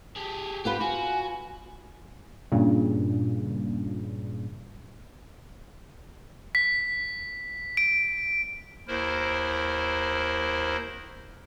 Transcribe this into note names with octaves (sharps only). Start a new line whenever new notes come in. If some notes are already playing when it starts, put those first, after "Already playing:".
G4 G#4 A5
B3 F4 G4 B4
F4 F#4 G#5
G2 A#2 C#3
B6
D7
D#2 E4 A#4 C5